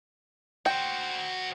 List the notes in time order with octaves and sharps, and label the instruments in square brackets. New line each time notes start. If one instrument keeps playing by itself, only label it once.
[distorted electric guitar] F#4 C5 [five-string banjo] G5